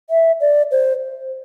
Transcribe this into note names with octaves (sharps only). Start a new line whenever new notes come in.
E5
D5
C5